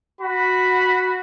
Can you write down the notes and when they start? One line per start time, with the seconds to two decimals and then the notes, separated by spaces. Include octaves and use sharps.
0.21 F#4 B5